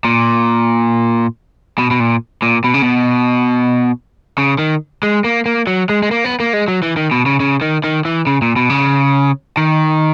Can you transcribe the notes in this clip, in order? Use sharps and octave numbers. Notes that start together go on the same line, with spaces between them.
A#2
B2
B2
A#2
A#2
B2
C#3
B2
C#3
D#3
G#3
A#3
A#3
F#3
G#3
G#3
A#3
B3
A#3
G#3
F#3
E3
D#3
B2
C#3
C#3
D#3
D#3
E3
C#3
A#2
B2
C#3
D#3